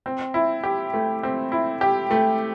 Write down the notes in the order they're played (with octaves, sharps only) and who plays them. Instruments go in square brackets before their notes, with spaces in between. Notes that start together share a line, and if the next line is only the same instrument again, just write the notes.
[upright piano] C4
E4
G4
A3
C4
E4
G4
A3